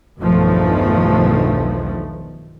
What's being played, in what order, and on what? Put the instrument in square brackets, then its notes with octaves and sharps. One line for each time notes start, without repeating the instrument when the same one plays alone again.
[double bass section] B1 E2 G2 D#3 F3 A3